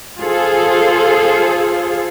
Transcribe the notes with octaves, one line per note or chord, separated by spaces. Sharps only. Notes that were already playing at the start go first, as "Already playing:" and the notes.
F4 G#4 A4 C5